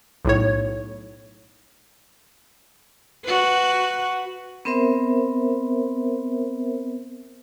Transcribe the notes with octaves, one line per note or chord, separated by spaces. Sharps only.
B1 A2 C#5
F#4 B4
B3 C4 A#4 C5 E5